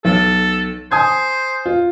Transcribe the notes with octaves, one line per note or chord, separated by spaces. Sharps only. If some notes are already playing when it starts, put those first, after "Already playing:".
B1 A4
C5 G#5 D#6 G#6
F4